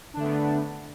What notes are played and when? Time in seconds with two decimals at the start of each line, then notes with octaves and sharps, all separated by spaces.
0.14 D4
0.17 D3
0.20 A3
0.23 B3